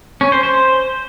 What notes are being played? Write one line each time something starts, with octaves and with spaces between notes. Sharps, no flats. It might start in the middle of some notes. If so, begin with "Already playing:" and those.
C#4
C5
C5